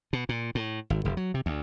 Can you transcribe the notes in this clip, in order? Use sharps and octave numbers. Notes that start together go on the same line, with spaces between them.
B2
A#2
A2
G#1
F1
F#3
C3
D2